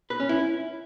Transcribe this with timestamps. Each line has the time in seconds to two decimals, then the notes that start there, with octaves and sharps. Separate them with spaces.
0.10 B4
0.20 C#4
0.29 E4